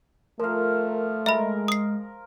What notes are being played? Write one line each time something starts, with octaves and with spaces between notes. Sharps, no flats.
F3 A3 A#4 F5
G#3 A#4 E5 A#5 B5
D#6 C7